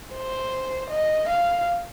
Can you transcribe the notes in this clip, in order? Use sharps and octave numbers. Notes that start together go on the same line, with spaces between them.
C5
D#5
F5